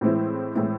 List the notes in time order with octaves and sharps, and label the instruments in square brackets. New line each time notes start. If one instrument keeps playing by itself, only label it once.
[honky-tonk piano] A2 E3 G#3 C4 E4
A2 E3 G#3 C4 E4